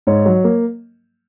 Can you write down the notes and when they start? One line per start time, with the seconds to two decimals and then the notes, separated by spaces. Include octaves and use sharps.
0.07 G#2 C#5
0.26 F#3
0.44 A#3